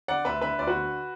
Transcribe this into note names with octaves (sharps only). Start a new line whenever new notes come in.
D3 D5 F#5
D2 B4 E5
D3 B4 E5
D2 D5
F#4 B4
D3